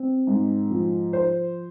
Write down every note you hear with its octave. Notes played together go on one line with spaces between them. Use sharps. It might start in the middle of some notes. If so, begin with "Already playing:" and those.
Already playing: C4
G#2
F3
C5